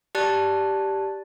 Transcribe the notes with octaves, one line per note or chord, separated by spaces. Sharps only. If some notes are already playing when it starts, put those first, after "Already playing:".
G4 D5 A5 F#6 A6